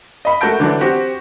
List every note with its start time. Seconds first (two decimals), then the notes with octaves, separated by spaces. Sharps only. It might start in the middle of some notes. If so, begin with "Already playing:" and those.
0.25 D#5 B5
0.41 A3 F#4 A#4 A5 G6 D7
0.60 D3 E3 F#3 D4
0.81 C4 F#4 G4